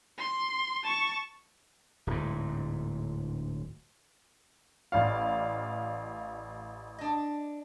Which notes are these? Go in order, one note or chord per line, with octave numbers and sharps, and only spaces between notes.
C6
A5 C#6
D1 G#2
A1 D5 F5
D4 D#5